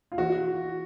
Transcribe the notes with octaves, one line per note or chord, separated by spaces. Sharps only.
F4
E3 F#4